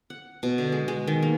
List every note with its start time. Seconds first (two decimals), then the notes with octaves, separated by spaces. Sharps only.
0.10 F#5
0.43 B2
0.58 D3
0.72 G#3
0.88 G#3
1.07 D#3
1.23 A#3